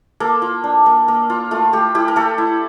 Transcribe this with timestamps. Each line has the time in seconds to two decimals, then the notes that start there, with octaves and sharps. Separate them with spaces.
0.20 A#3 A4
0.42 F4
0.64 D4
0.86 A#3
1.08 A#3
1.30 F4
1.51 A3 F4
1.73 A3 G4
1.95 E4 G4
2.08 A#4
2.16 A3 A4
2.38 E4